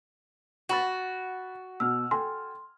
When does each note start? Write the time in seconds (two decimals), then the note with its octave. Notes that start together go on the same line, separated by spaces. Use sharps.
0.69 F#4 F#5 B5 A6
1.80 B2 E6 F6
2.11 A4 G5 G#5 C6